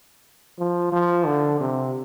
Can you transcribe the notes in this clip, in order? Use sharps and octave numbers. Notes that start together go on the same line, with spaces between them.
F3
F3
D3
C3